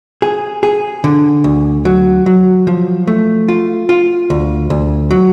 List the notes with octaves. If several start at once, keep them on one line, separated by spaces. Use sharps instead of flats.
G#4
G#4
D3
D2
F#3
F#3
F3
A3
F4
F4
D2
D2
F#3